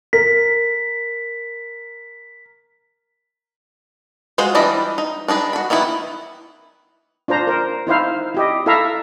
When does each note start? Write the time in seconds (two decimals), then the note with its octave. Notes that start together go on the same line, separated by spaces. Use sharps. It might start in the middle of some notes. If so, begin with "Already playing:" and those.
0.13 A#4 B6
4.38 G#3 F4 F#4 G#4 C5
4.55 E3 G3 D4 E4 D#5
4.98 D#4
5.28 D4 D#4 G#4 B4
5.53 F#4 B5
5.70 D#3 E3 B3 E4
7.28 D4 F4 C5 A#5
7.47 A#4 C5
7.87 D#4 E4 C5 F5
8.35 E4 G4 D#5
8.66 E4 A4 E5 F5 A#5